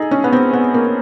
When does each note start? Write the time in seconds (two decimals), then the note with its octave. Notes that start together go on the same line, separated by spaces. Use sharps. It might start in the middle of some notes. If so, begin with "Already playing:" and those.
Already playing: D#4 G#4 A4
0.11 C#4
0.24 B3
0.33 C4
0.53 B3
0.74 A#3